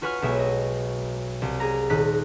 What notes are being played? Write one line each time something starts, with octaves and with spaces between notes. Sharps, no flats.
F4 F#4 B4 G#5 C#6 F6
B1 B2 G#3 E5 G#5
D#5
C2
G#4 A#5
D#1 D#4 F#6 B6